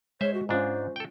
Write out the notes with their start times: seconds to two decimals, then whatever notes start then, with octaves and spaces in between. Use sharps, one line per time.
0.21 G#3 C5 C#5 E5
0.34 F#4
0.49 G#2 C#4 D4 F4 C5 D#5
0.96 A4 G5